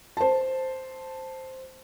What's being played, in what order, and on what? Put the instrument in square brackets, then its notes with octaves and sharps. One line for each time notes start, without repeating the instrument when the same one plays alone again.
[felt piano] C5 A5